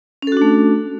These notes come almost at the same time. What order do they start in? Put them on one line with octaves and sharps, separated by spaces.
C#4 A4 F#4 D4 A3